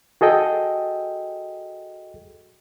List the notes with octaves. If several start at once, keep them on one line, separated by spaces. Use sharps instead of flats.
F#4 G#4 A4 D#5 G5